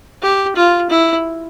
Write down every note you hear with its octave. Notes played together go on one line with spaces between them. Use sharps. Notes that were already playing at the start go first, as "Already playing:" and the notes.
G4
F4
E4